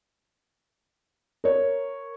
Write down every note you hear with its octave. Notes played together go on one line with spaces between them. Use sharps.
A#4 C#5